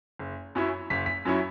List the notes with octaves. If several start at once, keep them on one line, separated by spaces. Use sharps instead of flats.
F#1
F#2 F#3 C#4 E4
F#1 B6
B6
F#2 F#3 C#4 E4